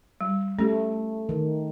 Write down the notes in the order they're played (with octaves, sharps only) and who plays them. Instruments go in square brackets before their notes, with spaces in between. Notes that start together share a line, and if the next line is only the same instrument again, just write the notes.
[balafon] G3
[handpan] A3 [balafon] C#4 G4
[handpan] D#3